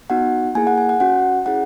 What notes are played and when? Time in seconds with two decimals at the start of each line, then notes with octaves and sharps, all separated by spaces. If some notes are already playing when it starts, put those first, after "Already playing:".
0.10 B3 D#4 F#4 F#5
0.55 A#3 E4 G#4 G#5
0.67 F#5
0.78 G#5
0.89 F#5
1.00 C#4 F#4 F#5
1.46 C#4 E4 G#4 F#5